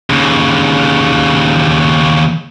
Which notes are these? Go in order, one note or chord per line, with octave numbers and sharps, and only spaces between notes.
D#2 C#3